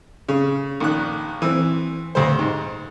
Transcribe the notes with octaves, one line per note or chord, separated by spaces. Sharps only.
C#3
A#1 D#3 F#6
E3 C4
D2 G2 C5
G#2